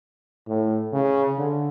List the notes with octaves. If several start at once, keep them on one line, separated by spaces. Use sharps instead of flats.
A2
C#3
D3